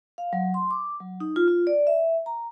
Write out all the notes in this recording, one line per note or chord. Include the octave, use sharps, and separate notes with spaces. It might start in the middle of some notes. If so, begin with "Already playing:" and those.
F5
F#3
C6
D6
F#3
D#4
F4
F4
D5
E5
A#5